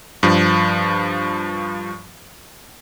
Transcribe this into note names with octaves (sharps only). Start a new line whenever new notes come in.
G2 F3